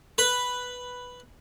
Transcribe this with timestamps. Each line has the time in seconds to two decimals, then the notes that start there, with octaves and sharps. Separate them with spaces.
0.18 B4